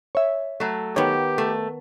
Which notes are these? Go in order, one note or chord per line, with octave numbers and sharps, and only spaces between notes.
C#5 E5
F#3 A3
D#3 B3 G4 C#5
A3